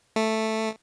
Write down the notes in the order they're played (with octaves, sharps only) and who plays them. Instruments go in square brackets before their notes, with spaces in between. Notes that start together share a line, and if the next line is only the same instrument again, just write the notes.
[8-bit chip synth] A3